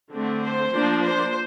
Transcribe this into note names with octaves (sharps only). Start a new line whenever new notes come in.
D3 A3 C4
C5
F3 A#3 D4
C5